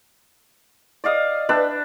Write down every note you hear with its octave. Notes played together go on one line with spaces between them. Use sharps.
D5 D#5 F5 D#6
D4 B4 E5 G5